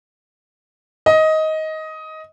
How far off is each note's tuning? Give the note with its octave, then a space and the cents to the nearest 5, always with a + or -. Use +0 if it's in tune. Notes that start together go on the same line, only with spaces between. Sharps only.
D#5 +15